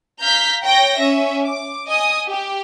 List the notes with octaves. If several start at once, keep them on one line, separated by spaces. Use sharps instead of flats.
F5 A#5 F6 G6 B6
C#5 G5 A#6
C#4 E5
D6
D#5 G#5 D#6
G4